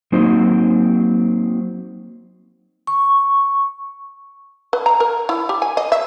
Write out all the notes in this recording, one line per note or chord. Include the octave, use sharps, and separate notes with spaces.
F#3 A#3 C4 D#4 C5
C#6
B4
A#5
A#4
E4
G4
G#5
D#5
E5